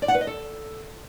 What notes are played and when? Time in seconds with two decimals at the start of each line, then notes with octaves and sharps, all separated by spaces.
0.02 D5
0.08 F#5
0.15 B4
0.21 D#5
0.27 A4